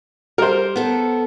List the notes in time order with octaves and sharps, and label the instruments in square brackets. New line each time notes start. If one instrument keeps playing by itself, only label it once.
[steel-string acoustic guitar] G3 [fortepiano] A#4 C5
[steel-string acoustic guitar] B3 A4